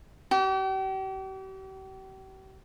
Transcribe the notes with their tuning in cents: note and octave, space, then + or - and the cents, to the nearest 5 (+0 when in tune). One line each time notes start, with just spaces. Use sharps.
G4 -40